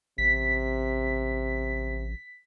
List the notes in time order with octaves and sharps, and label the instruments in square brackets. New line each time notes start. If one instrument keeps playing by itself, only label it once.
[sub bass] A1 [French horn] C3 [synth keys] B6